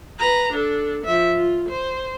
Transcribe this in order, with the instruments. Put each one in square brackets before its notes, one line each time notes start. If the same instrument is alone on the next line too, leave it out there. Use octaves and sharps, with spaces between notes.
[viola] B4 A#5
D4 A4
F3 E5
F4
C5